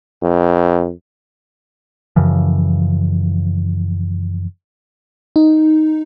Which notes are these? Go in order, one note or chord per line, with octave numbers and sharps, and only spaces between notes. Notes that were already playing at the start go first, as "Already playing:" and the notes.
F2
F#2 C#3 E3 F3
D#4